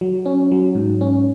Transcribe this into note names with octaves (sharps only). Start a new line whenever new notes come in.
F#3
C#4
F#3
G#2
C#4